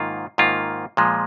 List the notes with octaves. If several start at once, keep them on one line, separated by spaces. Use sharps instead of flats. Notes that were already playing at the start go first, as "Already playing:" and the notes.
Already playing: G#2 D#3 A#3 F4
G#2 D#3 A#3 F4
A#2 F3 G#3